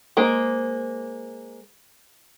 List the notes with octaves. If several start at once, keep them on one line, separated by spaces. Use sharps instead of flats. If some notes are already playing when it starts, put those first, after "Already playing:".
G#3 A#3 C5